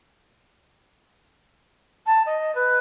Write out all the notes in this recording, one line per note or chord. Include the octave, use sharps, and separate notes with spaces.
A5
D#5
B4